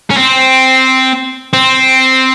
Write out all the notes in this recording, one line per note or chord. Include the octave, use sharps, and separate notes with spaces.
C#4
C4
C4